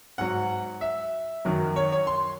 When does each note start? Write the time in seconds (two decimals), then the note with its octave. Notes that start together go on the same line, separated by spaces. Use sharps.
0.18 G#2 F#3 F#5
0.81 E5
1.45 F#2 D#3 F#3
1.76 C#5
1.92 C#5
2.07 C6